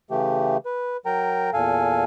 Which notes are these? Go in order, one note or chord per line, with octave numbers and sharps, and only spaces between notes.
C#3 E3 A3 G4
B4
F#3 A#4 G5 A#5
E2 A#2 A4 F5 G#5